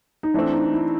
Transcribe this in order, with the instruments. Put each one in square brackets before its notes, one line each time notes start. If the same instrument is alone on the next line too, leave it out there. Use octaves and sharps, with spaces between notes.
[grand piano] D#4
[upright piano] E3 A3 C4 [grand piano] D4
[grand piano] D#4
E4